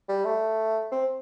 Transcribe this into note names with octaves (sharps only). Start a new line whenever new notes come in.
G3
A3
C4